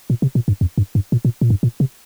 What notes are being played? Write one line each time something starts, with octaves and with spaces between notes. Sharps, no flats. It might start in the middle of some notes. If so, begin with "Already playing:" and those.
A#2
C3
A#2
G2
F2
G2
G2
A#2
A#2
A#2
G2
A#2
C3